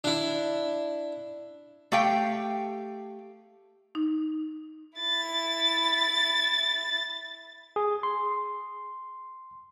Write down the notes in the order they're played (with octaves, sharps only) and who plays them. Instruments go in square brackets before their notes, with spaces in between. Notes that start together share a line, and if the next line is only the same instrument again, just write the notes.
[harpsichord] D4 E4
[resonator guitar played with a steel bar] A3 G4 F5 G5
[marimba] D#4
[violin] E4 A6
[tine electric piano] G#4
C6